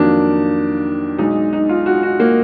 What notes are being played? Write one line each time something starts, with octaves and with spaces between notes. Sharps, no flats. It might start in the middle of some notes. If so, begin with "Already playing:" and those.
Already playing: F2 D#3 F#3 A#3 D4
B1 B2 G#3 D#4
D#4
F4
F#4
F#4
A#3